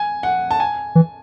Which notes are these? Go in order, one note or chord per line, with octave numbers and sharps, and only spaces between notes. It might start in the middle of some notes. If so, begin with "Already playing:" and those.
Already playing: G#5
F#5
A5
G#5
E3